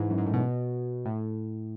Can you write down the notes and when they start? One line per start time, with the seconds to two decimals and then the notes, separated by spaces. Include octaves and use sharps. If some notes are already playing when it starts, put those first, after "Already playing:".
Already playing: G#2 E3
0.10 F#2
0.18 G#2
0.26 A2
0.34 B2
1.06 A2